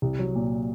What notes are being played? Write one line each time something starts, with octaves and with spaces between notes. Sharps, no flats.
C2
F#3
A#2